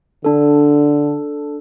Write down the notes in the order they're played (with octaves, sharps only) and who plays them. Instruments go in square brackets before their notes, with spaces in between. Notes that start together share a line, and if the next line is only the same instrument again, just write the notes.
[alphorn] D3 [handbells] D4 A4